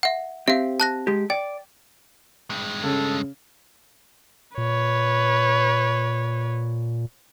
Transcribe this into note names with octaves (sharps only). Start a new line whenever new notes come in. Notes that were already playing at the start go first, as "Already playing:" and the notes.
E5 F#5
C4 G4 E5 F5
A5 F#6 A#6
G#3 G4
D5 G5
G2 G#3
C#3 A4
A#2 B4 C#5